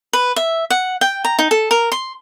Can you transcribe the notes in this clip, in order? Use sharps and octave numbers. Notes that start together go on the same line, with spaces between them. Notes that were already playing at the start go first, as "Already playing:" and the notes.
B4
E5
F#5
G5
A#5
D#4
A4
A#4
C6